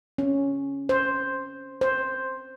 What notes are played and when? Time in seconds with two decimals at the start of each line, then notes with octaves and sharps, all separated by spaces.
0.18 C#4
0.89 C5
1.81 C5